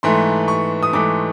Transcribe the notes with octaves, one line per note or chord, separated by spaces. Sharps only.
G#2 E3 A3 C6
C#6
D#6
G#2 E3 A3 D6